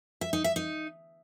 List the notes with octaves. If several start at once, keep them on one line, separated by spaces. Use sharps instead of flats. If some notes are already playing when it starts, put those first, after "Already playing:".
E5
D#4
E5
D#4